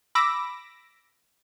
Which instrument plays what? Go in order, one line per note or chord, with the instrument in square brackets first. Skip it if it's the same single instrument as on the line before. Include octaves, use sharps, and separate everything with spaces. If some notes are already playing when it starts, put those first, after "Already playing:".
[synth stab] B5 D6 E6 A#6